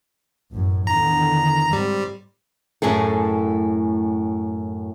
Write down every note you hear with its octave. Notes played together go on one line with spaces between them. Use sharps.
A1 F#2
E2 D3 D#3 A#5
G#2 G3 C4
F#2 A2 A3 G#4 A4